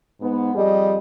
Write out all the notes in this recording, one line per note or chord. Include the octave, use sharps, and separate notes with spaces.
G#2 B3
F2 G3 G#4 D#5